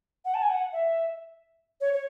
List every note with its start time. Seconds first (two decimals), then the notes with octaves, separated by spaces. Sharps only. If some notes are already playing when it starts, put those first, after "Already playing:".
0.24 F#5
0.34 A5
0.42 G#5
0.49 F#5
0.72 E5
1.80 C#5
1.93 C#5